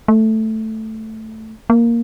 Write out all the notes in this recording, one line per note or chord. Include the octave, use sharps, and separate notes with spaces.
A3
A#3